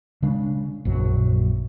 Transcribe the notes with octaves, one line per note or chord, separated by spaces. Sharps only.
C#3 G#3 D4
A#1 F#2 F#3